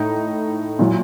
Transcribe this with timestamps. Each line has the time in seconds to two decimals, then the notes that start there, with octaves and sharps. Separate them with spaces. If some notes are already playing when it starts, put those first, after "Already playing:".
Already playing: A2 D#4
0.79 A#2 F#3 E4